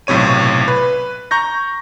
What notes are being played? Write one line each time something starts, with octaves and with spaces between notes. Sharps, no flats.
B1 A2 C3 C#5 D#7
B4
A#5 C#6 G6 A#6